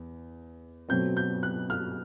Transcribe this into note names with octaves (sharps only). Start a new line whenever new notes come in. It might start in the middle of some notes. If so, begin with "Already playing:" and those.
Already playing: E2
B2 F#3 A3 C4 G6
G6
F#6
F6